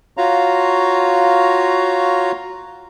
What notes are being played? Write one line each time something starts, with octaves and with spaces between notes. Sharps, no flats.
F4 F#4 C#5 F5 A#5